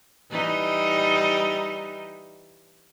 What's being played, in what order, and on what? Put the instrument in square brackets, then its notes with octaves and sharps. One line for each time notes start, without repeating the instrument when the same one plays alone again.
[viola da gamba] E3 G3 D#4